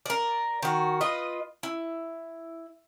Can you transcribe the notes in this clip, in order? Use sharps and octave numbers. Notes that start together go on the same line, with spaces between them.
A#4 D5
D#3 F#4
F4 B4 D#5
E4